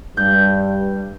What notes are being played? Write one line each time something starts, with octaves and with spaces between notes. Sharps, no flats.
G2 G3 G6